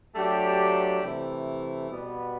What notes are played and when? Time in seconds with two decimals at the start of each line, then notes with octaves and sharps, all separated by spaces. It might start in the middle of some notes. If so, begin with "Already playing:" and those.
0.15 F#3 A3 D4 G4
1.02 C3 E3 A3
1.88 B2 G3 B3